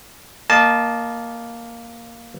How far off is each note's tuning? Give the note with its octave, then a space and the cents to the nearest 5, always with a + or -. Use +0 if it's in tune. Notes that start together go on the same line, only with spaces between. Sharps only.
A#3 +0 D#5 -20 A5 -20